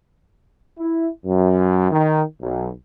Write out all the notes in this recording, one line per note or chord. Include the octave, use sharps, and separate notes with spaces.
E4
F#2
D#3
B1